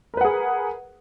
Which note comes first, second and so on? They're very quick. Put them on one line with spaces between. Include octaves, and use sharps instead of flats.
A#4 B4 F#5 G#4